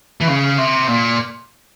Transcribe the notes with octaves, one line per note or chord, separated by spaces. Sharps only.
E3
C#3
C3
A#2